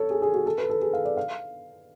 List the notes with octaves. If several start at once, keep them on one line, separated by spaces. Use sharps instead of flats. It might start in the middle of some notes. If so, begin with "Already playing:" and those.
Already playing: A4 C#5
G#4
G#4
F#4
A4
B4
A4
G#4
F5
D5
F5